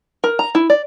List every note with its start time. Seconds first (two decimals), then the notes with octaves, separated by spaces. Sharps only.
0.24 A#4
0.39 A#5
0.55 E4
0.70 D5